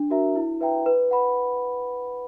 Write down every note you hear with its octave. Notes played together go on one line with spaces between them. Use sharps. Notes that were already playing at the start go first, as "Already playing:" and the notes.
Already playing: D4
F#4 A#4 E5 A#5
E4
B4 E5 G5 A#5
B4
F#5 B5